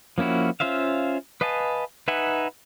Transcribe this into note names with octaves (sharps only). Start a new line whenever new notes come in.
F3 A#3 C#4 E4 F#4
C#4 F4 C5 E5 F5
B4 D#5 F5 G#5 A5
D#4 B4 E5 F#5 G#5